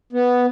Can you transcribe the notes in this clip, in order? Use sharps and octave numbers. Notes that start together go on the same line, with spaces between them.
B3